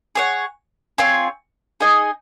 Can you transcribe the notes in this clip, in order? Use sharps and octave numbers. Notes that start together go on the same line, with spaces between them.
G#4 C#5 F#5
C4 F4 G#4 C#5
D#4 G#4 D#5 G#5